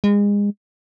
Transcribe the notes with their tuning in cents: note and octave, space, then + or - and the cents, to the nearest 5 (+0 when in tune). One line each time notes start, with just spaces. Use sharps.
G#3 -30